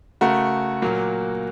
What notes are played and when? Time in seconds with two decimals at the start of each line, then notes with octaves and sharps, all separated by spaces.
0.21 C#3 A3 F#4 A#4
0.82 A#2 F#3 A#3